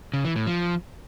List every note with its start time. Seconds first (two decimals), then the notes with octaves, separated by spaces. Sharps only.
0.13 C#3
0.25 E3
0.36 A2
0.47 F3